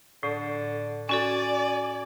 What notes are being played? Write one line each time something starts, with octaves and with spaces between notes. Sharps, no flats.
A2 D3
C#4 F#4 A4 D5 G#5